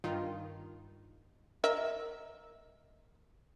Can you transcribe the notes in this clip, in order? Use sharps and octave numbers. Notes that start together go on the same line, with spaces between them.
G2 D#3 D#4 F4
A#4 D#5 E5